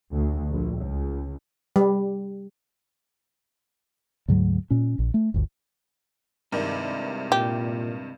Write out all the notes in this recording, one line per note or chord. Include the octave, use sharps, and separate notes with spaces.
D2
A#1
C#2
G3
D2 G#2 F#3
A#2 C#4
A#1
A3
G1 D2
G2 C3 D#3 G#3 E4 D5
A#2 G4